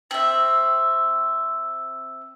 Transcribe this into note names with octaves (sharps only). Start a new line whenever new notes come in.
C4 E5